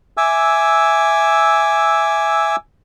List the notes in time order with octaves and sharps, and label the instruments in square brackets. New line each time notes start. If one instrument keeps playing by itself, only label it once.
[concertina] E5 G#5 D6 E6